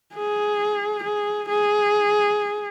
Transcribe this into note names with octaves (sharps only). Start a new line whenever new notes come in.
G#4
G#4
G#4